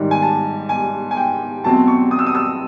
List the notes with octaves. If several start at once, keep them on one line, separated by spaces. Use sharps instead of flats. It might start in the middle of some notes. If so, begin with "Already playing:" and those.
Already playing: G#2 D#3 G3
G#5
A5
G#5
G#5
G5
E2 B2 F#3 A3 C4 A5
C#6
D#6
E6
D#6
E6